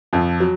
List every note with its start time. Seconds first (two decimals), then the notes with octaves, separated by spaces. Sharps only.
0.13 F2 F3
0.40 F#3